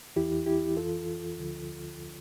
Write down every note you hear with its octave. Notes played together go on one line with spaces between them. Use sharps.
E2 E3 E4 G4
E4 G4
F2 E3 F4 A4
D2 D3 F3